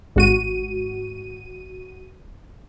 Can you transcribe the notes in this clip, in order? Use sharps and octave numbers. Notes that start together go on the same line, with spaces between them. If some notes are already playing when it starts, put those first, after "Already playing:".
G#1 F#4 D#7